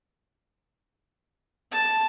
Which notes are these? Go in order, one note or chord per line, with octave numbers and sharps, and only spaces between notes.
A5